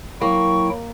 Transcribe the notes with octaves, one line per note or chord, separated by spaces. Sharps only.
F#3 A#3 E4 G5 C#6